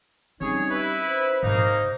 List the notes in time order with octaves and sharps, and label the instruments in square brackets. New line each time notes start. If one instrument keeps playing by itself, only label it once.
[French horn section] G3 D#4 [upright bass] C4 C#4 [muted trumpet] G#4 [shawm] C#5
[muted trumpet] E4 [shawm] B4
[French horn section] C5
[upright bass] G#2 C3 [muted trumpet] A#3 [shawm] D#4